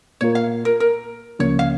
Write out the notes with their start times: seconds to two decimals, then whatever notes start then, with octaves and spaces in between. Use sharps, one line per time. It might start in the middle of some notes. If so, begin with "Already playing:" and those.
0.21 A#2 A#3 F4 A#4 C#5
0.35 F5
0.65 A#4
0.80 A#4
1.39 C#2 C#3 F3 A#3 C#4 C#5
1.59 F5